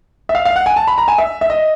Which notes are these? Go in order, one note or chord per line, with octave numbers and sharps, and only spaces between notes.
E5
F5
F5
F#5
G#5
A5
B5
A#5
G#5
E5
E5
D#5